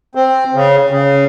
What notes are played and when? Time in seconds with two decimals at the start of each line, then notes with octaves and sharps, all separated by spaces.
0.15 C4
0.54 C#3
0.90 C#3